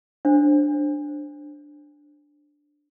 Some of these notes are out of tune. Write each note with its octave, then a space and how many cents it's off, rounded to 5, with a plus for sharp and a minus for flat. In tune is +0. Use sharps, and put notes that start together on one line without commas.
D4 +0 C5 +15